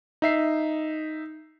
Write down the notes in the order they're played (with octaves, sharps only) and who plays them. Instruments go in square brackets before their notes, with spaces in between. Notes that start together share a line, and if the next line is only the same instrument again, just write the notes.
[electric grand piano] D#4 E5 C7